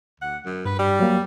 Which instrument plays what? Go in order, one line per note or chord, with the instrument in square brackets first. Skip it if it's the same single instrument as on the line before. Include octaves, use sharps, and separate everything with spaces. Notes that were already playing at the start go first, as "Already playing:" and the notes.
[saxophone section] D2 F#5
F#2
[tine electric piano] G2 [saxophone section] B4
[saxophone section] G3
[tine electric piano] F#3 A#3